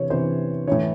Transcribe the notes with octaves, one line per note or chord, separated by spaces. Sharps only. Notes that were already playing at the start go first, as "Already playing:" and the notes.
Already playing: C3 E3 C#5
C3 E3 C5
A2 E3 C#5